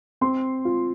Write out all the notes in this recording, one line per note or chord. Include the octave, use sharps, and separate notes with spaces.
C4 C6
F4